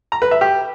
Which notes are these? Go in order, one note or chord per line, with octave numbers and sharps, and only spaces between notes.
A#5
B4
E5
G4